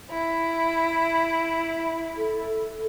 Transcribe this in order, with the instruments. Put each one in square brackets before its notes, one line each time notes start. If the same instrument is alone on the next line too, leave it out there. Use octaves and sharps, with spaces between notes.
[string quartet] E4
[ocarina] A4